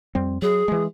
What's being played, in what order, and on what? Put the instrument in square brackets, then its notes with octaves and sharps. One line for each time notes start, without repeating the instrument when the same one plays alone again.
[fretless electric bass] F2 G3 C4
[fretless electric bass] F#3 [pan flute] G#4
[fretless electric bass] E3 G#3